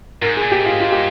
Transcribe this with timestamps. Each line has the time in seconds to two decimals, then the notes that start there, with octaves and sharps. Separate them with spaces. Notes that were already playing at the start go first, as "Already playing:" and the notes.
0.22 G#2 A#4
0.37 G#4
0.42 A#2
0.52 G4
0.61 G#2 F4
0.80 F4
0.92 G4